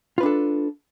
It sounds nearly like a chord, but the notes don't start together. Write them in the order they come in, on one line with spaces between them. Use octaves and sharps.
F4 B4 D4 A4